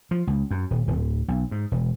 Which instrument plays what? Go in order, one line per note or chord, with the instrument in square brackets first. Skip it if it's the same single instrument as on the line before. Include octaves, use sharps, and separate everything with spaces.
[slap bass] F3
C#2
F#2
D#1
D1
B1
G#2
E1